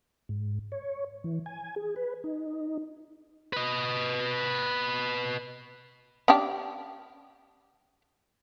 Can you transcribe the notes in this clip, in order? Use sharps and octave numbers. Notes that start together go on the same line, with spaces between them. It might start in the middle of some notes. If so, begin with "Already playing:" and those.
G#2
C#5
E3
G#5
G#4
B4
D#4
B4 D#5
C#4 D4 G4